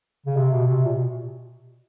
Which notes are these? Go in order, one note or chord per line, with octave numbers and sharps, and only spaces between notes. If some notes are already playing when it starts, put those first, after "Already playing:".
C#3
C3
B2
C3
A#2
B2